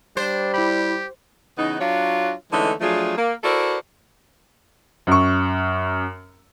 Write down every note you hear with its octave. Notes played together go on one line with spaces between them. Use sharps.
G3 D4 C5
E4 G4 B5
C#3 E3 B3 D#4
F#3 D4 F4 F#4 C#5
D3 E3 G#3 A3 C#4 D#4
F3 F#3 A3 D4 F4 G#4
A#3
E4 F#4 A4 A#4 C5 D5
F#2 C#6